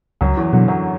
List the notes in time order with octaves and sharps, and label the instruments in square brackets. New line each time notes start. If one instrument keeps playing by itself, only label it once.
[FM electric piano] C#2 [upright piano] F#2 F#3
[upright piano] E2 E3
[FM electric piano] B2 F#3 [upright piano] D3
[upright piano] F#2 F#3